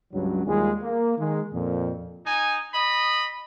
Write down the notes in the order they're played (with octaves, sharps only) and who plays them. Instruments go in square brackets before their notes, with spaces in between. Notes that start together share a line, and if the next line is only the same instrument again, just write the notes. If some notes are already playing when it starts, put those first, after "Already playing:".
[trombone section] C#2 G2 F#3
D#2 G3 G#3 F4 G#4
A#3
D#3 G#3
F2 A#2
[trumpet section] D#4 G#5
D#5 B5